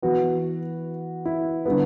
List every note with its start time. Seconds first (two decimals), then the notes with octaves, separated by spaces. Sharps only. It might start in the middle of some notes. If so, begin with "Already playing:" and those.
0.02 E3 B3 F#4
1.25 E4
1.66 D3 G3 B3